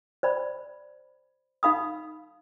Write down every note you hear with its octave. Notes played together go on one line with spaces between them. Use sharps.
C5 D5 B5
D#4 F5 B5 D#6